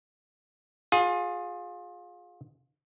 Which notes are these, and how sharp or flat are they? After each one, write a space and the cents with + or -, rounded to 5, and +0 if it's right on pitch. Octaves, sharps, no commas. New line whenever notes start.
F4 +25 G#4 +0